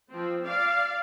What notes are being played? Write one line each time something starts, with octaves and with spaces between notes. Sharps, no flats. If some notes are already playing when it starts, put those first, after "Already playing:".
F3 C4
D5 F5